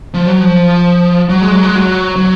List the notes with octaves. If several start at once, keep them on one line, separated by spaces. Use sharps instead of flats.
F3
F#3
F3
F#3
G#3
F#3
G#3
F#3
F#3